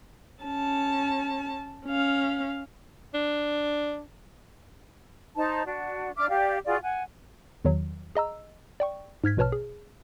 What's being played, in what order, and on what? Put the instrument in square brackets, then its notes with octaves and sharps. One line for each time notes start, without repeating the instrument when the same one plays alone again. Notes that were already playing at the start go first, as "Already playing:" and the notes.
[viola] C#4 A5
C#4 F5
[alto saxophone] D4
[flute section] D#4 C5 A5
D4 F#4
D4 E5 D6 F6
G4 D5 F5
F4 F#4 G#4 D5
F#5 G#5
[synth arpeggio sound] E2 D#3 F#3
G#4 D#5 A#5 E6
D5 G5 C#6
G#2 F6 G#6 B6
A#1 B2 B4 C#5 A5 F6
G#4